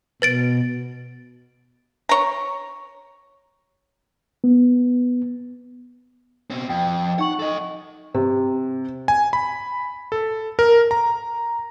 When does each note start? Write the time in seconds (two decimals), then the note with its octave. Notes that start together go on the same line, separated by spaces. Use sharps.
0.22 B2 B4 A6 D7
2.09 C#5 A#5
4.44 B3
6.50 B2 C4
6.70 F2 G5
7.19 D#4 F#5 C#6 F#7
7.39 A4 D#5
8.14 C3
9.08 G#5
9.33 B5
10.12 A4
10.59 A#4
10.91 A#5